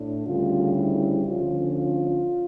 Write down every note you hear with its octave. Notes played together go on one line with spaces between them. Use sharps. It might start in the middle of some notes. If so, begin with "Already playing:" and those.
Already playing: A2 D4
D2 C#3 G3 C#4 F4
E4
D2 D3 F3 C#4 F4
F4